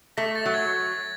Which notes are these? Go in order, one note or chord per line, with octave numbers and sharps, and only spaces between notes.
A3 A#6
A6
F#3
G#6